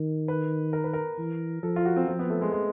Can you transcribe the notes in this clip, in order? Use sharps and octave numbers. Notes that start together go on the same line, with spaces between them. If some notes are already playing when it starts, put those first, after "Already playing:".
Already playing: D#3
B4
A#4
B4
A#4
E3
F3 A4
F4
F#4
C4
F3 C4
B3
A3
G#3
G#3